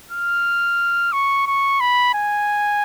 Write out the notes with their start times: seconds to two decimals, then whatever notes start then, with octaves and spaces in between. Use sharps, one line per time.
0.11 F6
1.13 C#6
1.47 C#6
1.80 B5
2.15 G#5